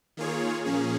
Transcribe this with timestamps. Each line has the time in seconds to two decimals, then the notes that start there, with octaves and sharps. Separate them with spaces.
0.17 D#3 A#3 F4 G#4 C#5
0.65 A#2 F3 A#3 C#4 G#4